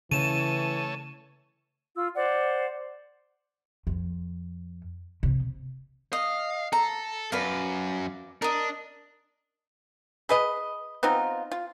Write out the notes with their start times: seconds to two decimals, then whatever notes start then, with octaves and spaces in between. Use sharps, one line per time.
0.11 C#3 E3 A3 C#5 A5 D#7 E7
1.96 F4 E6
2.16 C5 D5 F#5
3.87 F2
5.23 C3
6.13 D#5 F5
6.73 A4 A#5
7.32 F#2 B4 D5 F5
8.42 D4 A#4 D#5
10.29 G#4 B4 D#5
11.03 B3 C4 D#4 F4
11.52 F4